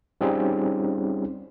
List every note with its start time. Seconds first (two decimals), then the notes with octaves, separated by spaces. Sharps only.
0.21 G3 C4 C#4 D#4 F4 G#4